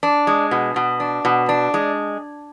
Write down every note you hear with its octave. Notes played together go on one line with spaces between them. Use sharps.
D4
G#3
B2
B2
D4
B2
D4
G#3